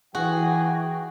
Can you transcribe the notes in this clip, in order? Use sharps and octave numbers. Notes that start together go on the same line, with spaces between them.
E3 F#4 G#4 G5